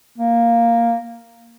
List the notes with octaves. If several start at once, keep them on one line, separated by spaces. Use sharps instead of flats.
A#3